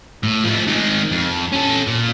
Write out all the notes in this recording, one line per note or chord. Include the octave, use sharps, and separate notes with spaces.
A2
F3 A3
D#3 G#3
F2
C#4 A4
A#2